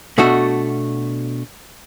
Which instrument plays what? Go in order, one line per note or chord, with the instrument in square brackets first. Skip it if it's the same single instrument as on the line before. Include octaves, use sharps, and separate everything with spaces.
[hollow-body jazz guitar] B2 A3 D4 F#4